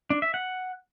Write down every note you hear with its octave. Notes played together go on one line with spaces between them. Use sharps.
D4
E5
F#5